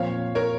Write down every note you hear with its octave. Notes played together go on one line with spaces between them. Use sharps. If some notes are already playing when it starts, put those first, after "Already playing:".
Already playing: A#2 F3 C4 C#5 F5
A#4 C#5